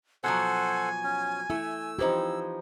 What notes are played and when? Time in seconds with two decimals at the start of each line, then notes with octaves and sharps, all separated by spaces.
0.24 B2 F3 F#3 A4 C5 F#5 G#5
1.04 C#4
1.50 A3 E4 E6
1.99 E3 F3 D#4 G4 C5